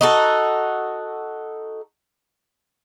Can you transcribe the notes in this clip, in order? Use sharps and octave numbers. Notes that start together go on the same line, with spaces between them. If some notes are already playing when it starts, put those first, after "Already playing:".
D#4 F#4 A4